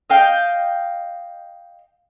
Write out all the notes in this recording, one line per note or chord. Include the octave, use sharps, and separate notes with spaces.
D#5 F5 G5